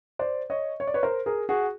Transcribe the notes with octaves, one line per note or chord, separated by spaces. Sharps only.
C5 D5
C#5 D#5
C#5
D5
B4 C#5
A#4 C5
G#4 A#4
F#4 G#4